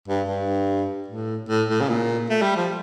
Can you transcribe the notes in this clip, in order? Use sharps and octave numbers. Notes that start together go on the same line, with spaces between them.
G2
G2
A2
A2
A2
C#3
A#2
A3
G3
F3